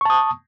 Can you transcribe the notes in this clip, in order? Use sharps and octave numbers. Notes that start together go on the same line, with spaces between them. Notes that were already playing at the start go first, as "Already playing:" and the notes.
A5 C#6 D#6